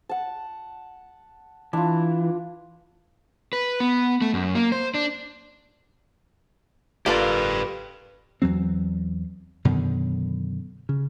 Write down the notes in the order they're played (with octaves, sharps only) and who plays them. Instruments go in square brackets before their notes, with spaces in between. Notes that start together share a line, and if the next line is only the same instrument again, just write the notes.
[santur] F#5 A5
[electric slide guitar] E3 [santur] D4 F4
[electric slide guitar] B4
B3
A3
F#2
A#3
C5
D4
[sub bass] F#1 [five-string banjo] A#3 F4 A4 [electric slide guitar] G4 B4
[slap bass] E2 F#3 C4
F#2 B2 D3 D#3
C#3